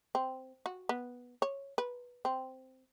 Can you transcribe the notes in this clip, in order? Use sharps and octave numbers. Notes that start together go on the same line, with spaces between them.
C4
F#4
B3
C#5
B4
C4